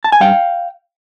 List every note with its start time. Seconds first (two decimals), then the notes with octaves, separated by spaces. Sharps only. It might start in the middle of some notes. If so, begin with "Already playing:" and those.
0.04 A5
0.12 G#5
0.20 G2 F5 G5